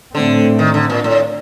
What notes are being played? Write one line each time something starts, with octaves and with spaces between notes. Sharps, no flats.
A2 D3 A3 C4
D#3
D3
A#2
A2